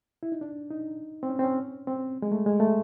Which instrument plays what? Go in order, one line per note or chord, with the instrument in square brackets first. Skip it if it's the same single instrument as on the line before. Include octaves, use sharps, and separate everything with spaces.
[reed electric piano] E4
D#4
D4
D#4
C4
C#4
C4
C#4
C4
G#3
A3
G#3
A3